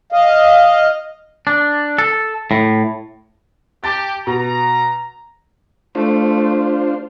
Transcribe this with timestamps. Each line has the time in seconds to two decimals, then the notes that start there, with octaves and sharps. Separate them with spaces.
0.12 D#5 F5
1.47 D4
1.98 A4
2.51 A2
3.84 G4 A5 A6
4.27 B2 A#5
5.95 A3 D4 F4 C5